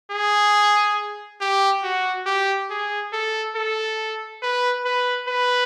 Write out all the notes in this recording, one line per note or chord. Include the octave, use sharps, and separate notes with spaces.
G#4
G4
F#4
G4
G#4
A4
A4
B4
B4
B4